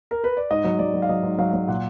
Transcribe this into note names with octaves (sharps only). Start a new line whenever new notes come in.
A#4
B4
D5
G#2 D#5
F#3
F#3 D5
F#3
F5
F#3 D#5
G#2
F#3 F5
F#3
A#2 F#5